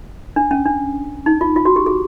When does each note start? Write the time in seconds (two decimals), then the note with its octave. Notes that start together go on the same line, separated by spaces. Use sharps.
0.36 D4
0.51 C#4
0.66 D4
1.26 D#4
1.41 F4
1.56 F4
1.65 F#4
1.76 G4
1.86 G#4